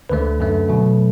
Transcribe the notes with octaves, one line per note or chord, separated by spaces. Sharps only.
D2 D3 A3 B4
F#2 D3 A3
B2 F#3 A3